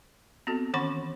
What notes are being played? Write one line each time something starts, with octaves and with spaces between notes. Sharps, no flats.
B3 C4 F#4 A4
D#3 E3 C#4 F#5 B5 C#6